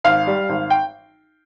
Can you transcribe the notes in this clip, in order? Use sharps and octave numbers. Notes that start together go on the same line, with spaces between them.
G#1 F5
G3
G#1
G5